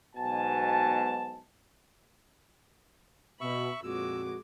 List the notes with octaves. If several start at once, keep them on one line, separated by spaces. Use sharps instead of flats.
B1 G#2 B2 G#5 A5
B2 E5 B5 C#6
F2 A#2 G#3 F#4 D6 E6